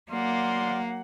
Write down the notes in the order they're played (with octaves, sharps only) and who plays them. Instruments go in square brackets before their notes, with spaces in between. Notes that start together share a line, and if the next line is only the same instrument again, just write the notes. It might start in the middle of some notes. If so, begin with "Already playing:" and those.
[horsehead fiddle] F#3 F#5 [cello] A#3 [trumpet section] D5 F5 C6